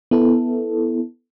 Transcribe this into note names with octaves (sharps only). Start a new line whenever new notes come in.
B3 E4 A4